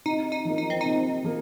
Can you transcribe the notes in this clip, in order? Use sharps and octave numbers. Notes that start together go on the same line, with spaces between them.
C3 D#4
D#4
F3 A#3
D#4
C4
C3 D#4
F3 A#3